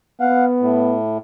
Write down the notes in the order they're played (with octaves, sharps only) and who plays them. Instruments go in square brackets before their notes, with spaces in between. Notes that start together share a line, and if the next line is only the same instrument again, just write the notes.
[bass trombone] B3 [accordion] F5 F#5
[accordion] A2